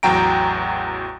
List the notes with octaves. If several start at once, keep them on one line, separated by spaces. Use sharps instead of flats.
A1 E2 F#3 G5 A#5 D7